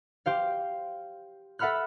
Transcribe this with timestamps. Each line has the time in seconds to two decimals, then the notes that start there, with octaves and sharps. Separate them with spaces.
0.26 G4 C5 F5
1.59 A4 E5 F#5 B5 F6 F#6